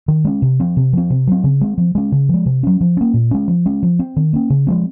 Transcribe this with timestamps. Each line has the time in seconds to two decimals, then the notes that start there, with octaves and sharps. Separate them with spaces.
0.08 D#3
0.25 G#3 C#4
0.42 C3
0.60 F3 C4
0.77 C3
0.93 F3 C4
1.10 C3
1.27 F#3 C4
1.44 C#3
1.61 G#3 C4
1.78 F3
1.95 G#3 C#4
2.12 C#3
2.29 F3 G#3
2.46 C3
2.63 F#3 C#4
2.81 F3
2.97 A#3 C#4
3.14 A#2
3.31 G#3 C#4
3.48 F3
3.66 G#3 C#4
3.83 F3
3.99 C4
4.16 D#3
4.33 A#3 C#4
4.50 C#3
4.67 F3 G#3 C4